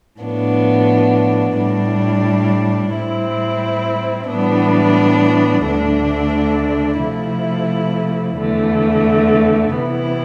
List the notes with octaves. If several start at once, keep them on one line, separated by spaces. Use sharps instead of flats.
A2 F3 B3 D4
A2 G3 D4
A2 G3 C4 E4
A2 E3 G3 B3 D4
D2 D3 A3 D4
C3 F3 A3 E4
E2 D3 A3
C3 E3 B3 E4